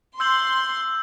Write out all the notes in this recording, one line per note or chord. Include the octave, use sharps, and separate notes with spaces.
C6 E6 G6 F#7